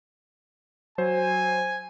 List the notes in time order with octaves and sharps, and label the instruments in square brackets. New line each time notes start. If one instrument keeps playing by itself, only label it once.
[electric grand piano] F#3 C5 [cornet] G#5